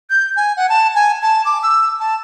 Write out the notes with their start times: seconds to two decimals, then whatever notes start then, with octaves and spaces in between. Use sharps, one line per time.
0.10 G6
0.36 G#5
0.57 F#5
0.69 A5
0.95 G#5
1.22 A5
1.45 D6
1.63 E6
2.00 A5